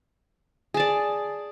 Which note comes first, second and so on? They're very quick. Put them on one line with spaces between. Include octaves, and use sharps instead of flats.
G#4 A5 D5